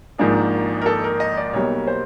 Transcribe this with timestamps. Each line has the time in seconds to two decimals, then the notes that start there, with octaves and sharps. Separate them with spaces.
0.18 G#1 G#2 F3 A#3 D4 G#4
0.82 A#4
0.86 A4
1.04 A#4
1.20 D#5
1.37 D5
1.53 B1 B2 G3 A#3 C#5
1.87 C5